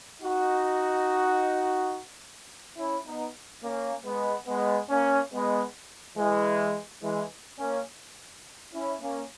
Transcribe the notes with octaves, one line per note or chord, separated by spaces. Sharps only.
D#4 F#4
C#4 E4
B3 D#4
A#3 C#4
G#3 B3
G#3 B3
A#3 C#4
G#3 B3
E3 G#3
E3 G#3
A#3 C#4
C#4 E4
A#3 C#4